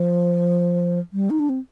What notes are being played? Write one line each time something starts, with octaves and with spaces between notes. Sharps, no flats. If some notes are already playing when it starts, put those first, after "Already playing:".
Already playing: F3
G3
D#4
D4
C4